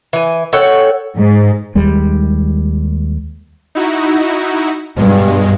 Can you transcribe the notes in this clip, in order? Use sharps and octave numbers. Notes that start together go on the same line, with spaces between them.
E3 G#5
A4 C#5 F#5 G5
G#2
D#2 G3 G#3
D#4 E4 F#4
G2 B2 G#3